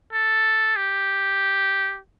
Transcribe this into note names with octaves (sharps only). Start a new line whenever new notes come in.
A4
G4